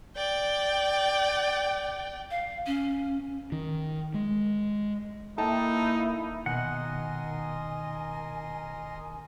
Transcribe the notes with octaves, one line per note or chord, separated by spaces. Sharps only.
D5 G5
F5
C#4
D#3
G#3
A#3 D#4 E4 A4 G5 A5
B2 D#3 A#4 D#5 F#5 G#5 C6 F#6